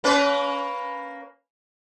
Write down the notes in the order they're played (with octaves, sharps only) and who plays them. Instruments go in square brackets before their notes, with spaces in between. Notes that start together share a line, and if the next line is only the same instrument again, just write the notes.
[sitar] A#3 C#4 B4